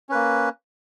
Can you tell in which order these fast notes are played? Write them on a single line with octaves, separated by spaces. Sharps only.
C#4 B4 A#3